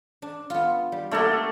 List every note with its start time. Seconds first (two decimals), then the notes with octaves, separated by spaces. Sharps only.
0.22 D4
0.50 B3 F4
0.92 G3
1.11 A3 A#3 D4 F#4 A4